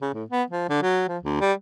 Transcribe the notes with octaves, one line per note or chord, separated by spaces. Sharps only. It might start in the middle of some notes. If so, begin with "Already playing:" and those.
C#3
A2
B3
F3
D3
F#3
F3
D2
G3